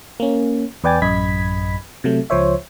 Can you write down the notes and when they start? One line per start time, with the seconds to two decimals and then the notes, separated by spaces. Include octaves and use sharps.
0.20 A#3 C#4
0.84 E2 B4 D5 G5 G#5 A6
1.02 A1 F#2 D#5 B5 G#6 B6
2.04 C3 F#3 A3
2.30 C#2 F3 C5 C#5 E5